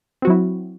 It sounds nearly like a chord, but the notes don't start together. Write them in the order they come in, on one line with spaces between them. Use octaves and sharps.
C4 F#4 F#3 E4